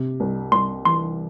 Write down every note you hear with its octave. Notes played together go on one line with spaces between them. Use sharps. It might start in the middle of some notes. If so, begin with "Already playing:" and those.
Already playing: C3
C2
C2 C6
E3 C6